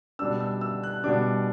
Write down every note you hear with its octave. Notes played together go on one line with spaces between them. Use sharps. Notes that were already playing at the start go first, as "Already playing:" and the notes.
B2 G3 D4 E6
E6
E6
F#6
B2 G3 D4 D6